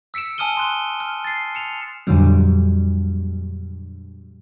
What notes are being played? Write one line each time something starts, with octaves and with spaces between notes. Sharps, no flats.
E6 B6 C#7 D7 E7
G#5 A5 D#6 F6 D#7 G7
C6 F#6 G7
F6
A6 C7
C#7 E7 F7
F2 A#2 D3 F#3 G3